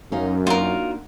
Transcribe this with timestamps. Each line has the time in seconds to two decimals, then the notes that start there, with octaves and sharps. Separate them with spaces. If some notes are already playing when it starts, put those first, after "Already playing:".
0.12 F#2 C#4 D#4 A#4 F5
0.47 A#3 D4 D#4 F4 F#4 A#4